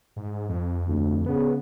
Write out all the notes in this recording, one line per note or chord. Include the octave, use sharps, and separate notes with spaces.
G#2
F2
D2
C#3 B3